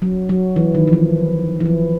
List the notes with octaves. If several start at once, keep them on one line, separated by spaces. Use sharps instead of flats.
F#3
F#3
E3
D#3
F3
E3
E3
F3